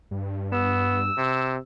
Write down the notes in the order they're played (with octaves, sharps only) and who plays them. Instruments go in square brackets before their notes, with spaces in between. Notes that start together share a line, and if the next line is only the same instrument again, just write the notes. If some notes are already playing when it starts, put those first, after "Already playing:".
[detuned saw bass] G2
[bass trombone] B3 [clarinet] E6
[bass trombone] C3